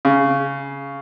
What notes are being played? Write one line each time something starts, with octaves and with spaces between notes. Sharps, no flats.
C#3